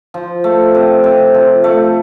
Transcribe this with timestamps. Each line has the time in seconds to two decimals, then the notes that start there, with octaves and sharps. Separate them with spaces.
0.14 F3
0.44 A3
0.75 C3
1.04 C3
1.34 F3
1.64 A3